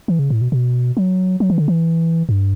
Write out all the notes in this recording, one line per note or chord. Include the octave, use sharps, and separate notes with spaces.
E3
C#3
A2
B2
B2
F#3
F#3
E3
D3
E3
G2